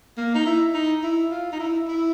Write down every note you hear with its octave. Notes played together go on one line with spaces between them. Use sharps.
A#3
D#4
E4
D#4
E4
F4
D#4
E4
E4